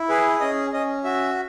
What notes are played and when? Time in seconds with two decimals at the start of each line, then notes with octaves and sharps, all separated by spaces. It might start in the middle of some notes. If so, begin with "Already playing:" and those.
Already playing: E4
0.09 G#4 B4
0.40 C#4 D#5
0.73 C#4 D#5
1.04 F#4 E5